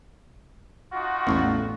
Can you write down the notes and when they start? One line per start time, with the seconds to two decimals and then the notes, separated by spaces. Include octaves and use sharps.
0.93 D#4 F4 F#4
1.27 A1 E2 A2 E3